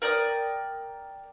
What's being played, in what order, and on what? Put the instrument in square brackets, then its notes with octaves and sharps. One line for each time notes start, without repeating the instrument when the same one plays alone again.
[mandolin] A#4 D5 G5 D#6